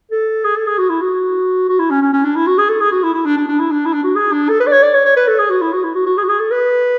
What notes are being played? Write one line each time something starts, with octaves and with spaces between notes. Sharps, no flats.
A4
G#4
A4
G#4
F#4
E4
F#4
F#4
E4
C#4
C#4
C#4
D4
E4
F#4
G#4
A4
G#4
F#4
E4
E4
D4
D4
D4
E4
D4
E4
D4
F#4
G#4
D4
A4
B4
D5
C#5
D5
C#5
C#5
B4
A4
G#4
F#4
E4
F#4
E4
F#4
F#4
G#4
F#4
G#4
A4
B4